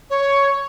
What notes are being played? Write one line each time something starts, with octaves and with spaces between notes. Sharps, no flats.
C#5